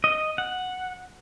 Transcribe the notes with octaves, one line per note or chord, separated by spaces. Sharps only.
D#5
F#5